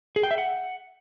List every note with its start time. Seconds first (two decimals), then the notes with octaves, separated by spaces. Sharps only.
0.16 G#4
0.23 G5
0.31 E5
0.38 F#5